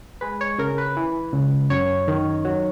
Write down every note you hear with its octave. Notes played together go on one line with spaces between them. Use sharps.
G#3 B4
C#5
C#3 A#4
B4
E3
C#2
F#2 C#5
D#3
F#3